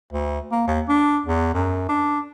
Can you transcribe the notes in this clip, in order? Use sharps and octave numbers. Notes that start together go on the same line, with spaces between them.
D2
A#3
D#2
D4
E2
F#2
D4